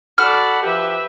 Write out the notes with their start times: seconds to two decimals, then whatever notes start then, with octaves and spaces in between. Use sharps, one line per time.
0.18 F#4 A4 D5 F#5 B5 F6
0.63 F3 G4 B4 E5